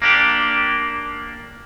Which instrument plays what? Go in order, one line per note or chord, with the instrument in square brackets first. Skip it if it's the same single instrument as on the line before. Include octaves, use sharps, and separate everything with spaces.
[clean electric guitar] A#3 D4 G4